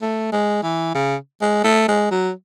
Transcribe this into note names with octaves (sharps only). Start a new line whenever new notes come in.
A3
G#3
E3
C#3
G#3
A3
G#3
F#3